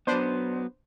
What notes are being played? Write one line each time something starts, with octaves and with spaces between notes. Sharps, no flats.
F#3 B3 D4 B4 C5